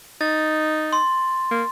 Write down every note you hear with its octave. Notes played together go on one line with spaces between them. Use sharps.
D#4 A6
C6
A#3